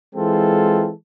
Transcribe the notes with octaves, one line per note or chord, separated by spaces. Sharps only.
E3 G#3 C4 F4 A4